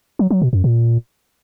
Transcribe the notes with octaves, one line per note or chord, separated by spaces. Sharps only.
F#3
F#3
B2
F#2
A#2